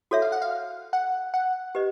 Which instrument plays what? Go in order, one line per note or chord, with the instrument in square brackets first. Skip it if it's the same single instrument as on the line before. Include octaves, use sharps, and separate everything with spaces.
[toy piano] F#4 A4 C#5 E5
[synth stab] F5
F#5
F5
F#5
F#5
[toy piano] G4 B4 D#5